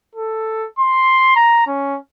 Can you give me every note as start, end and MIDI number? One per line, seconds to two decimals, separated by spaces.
0.15 0.67 69
0.79 1.35 84
1.36 1.66 82
1.67 1.98 61